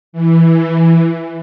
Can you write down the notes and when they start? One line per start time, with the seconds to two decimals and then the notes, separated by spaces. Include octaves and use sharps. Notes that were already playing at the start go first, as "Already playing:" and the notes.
0.13 E3